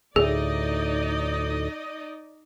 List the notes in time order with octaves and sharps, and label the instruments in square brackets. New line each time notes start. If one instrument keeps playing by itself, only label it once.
[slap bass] D2 A2 [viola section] D#4 D5 D#5 [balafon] G#4